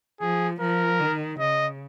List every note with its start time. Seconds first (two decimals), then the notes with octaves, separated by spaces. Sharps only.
0.21 F3 G#4
0.60 F3 A#4
1.00 D#3
1.39 C#3 D#5